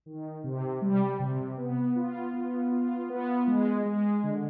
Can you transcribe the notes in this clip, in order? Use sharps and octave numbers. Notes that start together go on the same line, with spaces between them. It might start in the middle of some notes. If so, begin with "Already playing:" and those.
D#3
C3
G3
C3
B3
F4
B3
F4
B3
G#3
G#3
D3